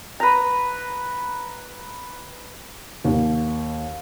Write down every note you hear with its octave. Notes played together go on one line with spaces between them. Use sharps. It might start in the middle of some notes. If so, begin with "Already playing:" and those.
B4 A#5
D#2